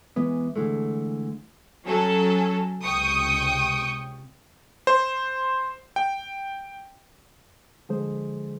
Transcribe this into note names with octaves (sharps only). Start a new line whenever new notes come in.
E3 G#3 B3
D3 E3 G#3 A3
F#3 C#4 A4
C#2 C3 G5 C#6 D#6
C5
G5
D3 F3 G#3 G#4 C5